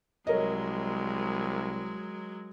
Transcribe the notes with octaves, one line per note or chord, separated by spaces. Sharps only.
C2 F#3 G#3 A#4 C#5 D#5